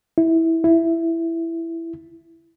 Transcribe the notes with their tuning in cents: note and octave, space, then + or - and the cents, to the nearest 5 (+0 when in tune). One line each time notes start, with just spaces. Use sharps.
E4 -15
E4 +5